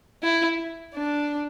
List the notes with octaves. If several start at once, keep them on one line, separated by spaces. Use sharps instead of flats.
E4
D4